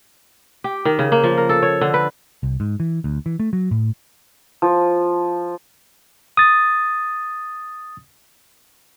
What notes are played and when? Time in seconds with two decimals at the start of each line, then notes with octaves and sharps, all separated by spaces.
0.64 G4
0.85 D#3
0.99 C#3
1.12 A#3
1.23 F3
1.38 A#4
1.49 A4
1.62 C#5
1.81 D3
1.94 B4
2.43 C2
2.60 G#2
2.80 E3
3.04 D2
3.26 E3
3.40 A3
3.53 F#3
3.71 A2
4.62 F3
6.37 D#6 A6